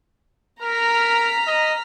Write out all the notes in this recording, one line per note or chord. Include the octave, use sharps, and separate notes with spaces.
A#4 A#5 F6 B6
D#5